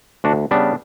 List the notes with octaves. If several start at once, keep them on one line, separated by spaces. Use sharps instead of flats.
D2 D4 F#4
C#3 G3 B3 D4